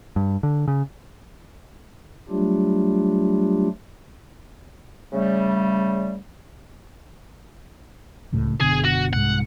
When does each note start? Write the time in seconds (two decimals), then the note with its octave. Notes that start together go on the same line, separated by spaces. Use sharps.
0.16 G2
0.43 D3
0.68 C#3
2.29 F#3 G3 A3 D4 F4 G4
5.12 C#3 G3 A3
8.32 D1 C#2 A2
8.61 F#1 B2 D3 G#4
8.85 F#4
9.13 C2 G#2 F#5